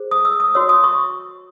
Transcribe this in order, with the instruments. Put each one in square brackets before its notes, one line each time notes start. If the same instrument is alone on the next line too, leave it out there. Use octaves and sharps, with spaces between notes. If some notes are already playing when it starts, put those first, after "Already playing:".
Already playing: [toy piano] G#4 C5
D#6
E6
D#6
F#4 C#5 E6
D#6
C#6